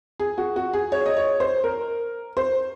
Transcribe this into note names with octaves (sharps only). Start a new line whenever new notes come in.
G#4
F#4
F#4
G#4
C#5
D#5
C#5
C5
A#4
C5